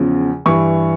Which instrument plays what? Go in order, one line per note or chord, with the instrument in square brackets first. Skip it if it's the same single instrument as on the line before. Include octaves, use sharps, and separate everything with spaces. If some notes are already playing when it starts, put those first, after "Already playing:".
Already playing: [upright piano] E2 C#3 F3
G2 E3 C#6